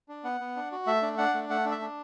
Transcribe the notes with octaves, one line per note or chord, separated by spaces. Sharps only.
D4
B3 F#5
B3
D4
F#4
A3 E5
D4
D4 F#5
A3
A3 F#5
D4
E5
D4